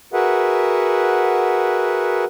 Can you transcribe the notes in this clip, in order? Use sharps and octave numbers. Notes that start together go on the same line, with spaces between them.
F#4 G#4 A#4 B4 E5 F#5